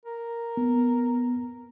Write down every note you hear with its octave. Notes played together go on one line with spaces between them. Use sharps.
A#4
B3